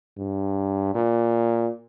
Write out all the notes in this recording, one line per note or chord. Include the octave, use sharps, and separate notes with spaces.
G2
A#2